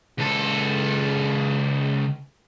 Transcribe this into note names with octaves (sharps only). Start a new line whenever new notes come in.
C#2 A4